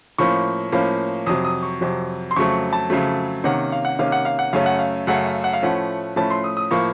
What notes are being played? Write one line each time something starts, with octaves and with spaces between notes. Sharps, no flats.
A2 F3 A#3 C#4 C#6
A2 F3 A#3 C#4
F2 C3 F#3 D#6
D#6
C#6
F2 C3 F#3
C6
F2 C#3 F#3 A3 C#6
A5
F2 C#3 F#3 A3
C3 D#3 A#3 C#4 F#5
F5
F#5
C3 D#3 A#3 C#4 F5
F#5
F5
F#5
F#2 C#3 A3 C#4 F5
F#5
F5
F#2 C#3 A3 C#4 F#5
F5
F#5
F5
A2 F3 A3 C#4 F#5
A2 F3 A3 C#4 A5
C6
D#6
D#6
A2 F3 A#3 C#6